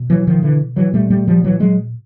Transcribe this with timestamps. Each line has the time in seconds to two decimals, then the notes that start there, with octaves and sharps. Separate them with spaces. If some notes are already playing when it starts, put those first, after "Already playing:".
Already playing: B2
0.10 E3 F#3
0.27 D#3 F3
0.43 D3 E3
0.76 E3 F#3
0.93 A#2 G3 A3
1.10 G3 A3
1.28 F3 G3
1.44 E3 F#3
1.60 F#3 G#3